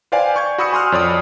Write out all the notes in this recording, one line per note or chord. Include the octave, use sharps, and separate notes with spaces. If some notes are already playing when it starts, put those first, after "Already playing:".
B4 C5 D5 F5 G5 G#5
C#6 G6 G#6
F#4 B5 D#6 E6 C#7
G#5 C6 D#6 F6 F#6
F2 C#5 D5 D#6